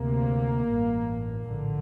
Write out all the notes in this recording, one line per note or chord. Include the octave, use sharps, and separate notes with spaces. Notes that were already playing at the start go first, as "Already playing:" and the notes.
Already playing: D2 C3 A#3
A1 G2
A#1 A2 D3